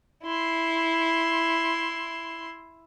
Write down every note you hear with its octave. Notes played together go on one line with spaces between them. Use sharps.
E4 C6